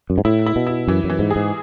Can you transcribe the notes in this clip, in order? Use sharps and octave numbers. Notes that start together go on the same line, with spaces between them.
F#2
G#2
A2 E4
E4
B2
E4
F#2 E3
F#2
E3
G#2
G#4
G#2